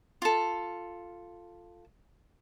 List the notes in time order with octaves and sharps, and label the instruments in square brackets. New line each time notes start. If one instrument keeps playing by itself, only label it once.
[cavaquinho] F4 A4